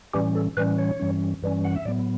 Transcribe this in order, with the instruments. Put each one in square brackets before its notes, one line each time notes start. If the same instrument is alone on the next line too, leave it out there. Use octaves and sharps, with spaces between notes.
[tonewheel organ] A2 E3 G3 C#4 G4
A4
A2 E3 G3 C#4 B4
C#5
G2 E3 G3 C#4
G2 E3 G3 C#4
F#5
E5
A2 F#3 B3 D5